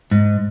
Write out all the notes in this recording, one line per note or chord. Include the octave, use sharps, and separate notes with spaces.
G#2